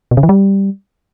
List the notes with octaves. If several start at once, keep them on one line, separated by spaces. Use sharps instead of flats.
B2
C#3
E3
G3